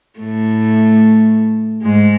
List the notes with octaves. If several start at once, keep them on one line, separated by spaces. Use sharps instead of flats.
A2 A3
G#2 G#3